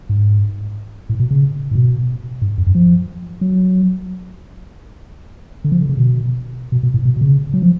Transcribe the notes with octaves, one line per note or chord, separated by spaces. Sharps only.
G#2
A2
B2
C#3
A2
B2
G#2
F2
F#2
F3
F#3
D3
F3
D3
C#3
B2
B2
B2
A2
B2
B2
C#3
F#3
F3